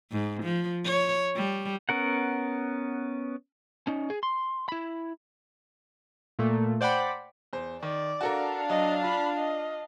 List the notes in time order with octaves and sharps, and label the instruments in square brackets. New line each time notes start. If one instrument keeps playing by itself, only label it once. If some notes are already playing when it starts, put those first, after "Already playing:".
[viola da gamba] G#2
F3
C#5
G3
[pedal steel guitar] B3 C#4 A#4 F#5
[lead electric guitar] C#4 D#4
G#4
C6
E4 B5
[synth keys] A#2 A3
C5 D5 F#5 G5 B5
[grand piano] E2 C5
[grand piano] D#3 [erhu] D5
[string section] D4 F5 [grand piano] F#4 A4 A#4
[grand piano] F#3 [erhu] D#5
[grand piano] F4 [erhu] B5
[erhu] D#5